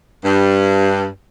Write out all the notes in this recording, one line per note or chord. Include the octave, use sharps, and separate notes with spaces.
G2